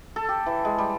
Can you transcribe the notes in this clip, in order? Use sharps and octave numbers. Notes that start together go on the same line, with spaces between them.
A4
G4
E3
G#3
G3